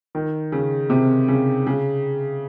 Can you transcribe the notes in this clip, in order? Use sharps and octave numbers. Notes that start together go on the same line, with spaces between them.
D#3
C#3
C3
C#3
C#3